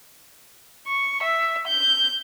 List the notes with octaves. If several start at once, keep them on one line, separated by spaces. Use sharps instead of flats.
C#6
E5
G6